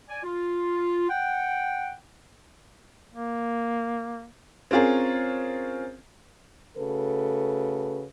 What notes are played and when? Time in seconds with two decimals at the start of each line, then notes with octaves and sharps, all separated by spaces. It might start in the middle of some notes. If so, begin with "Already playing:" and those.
0.09 D5 G#5
0.23 F4
1.08 F#5 G5
3.14 A#3
4.71 C4 C#4 F4 G#4 A#4
6.78 C#3 A3 F#4 A4 B4